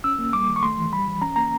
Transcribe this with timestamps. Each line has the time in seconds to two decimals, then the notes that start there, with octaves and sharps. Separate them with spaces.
0.04 C#4 E6
0.19 A#3
0.33 G3 D6
0.48 D#3
0.56 C#6
0.63 A3 C6
0.78 E3
0.92 G3 B5
1.07 E3
1.22 C#4 A#5
1.36 A#3 A#5